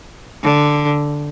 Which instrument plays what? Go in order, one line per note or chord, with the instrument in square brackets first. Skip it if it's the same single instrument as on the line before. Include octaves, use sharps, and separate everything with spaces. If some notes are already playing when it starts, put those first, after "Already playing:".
[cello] D3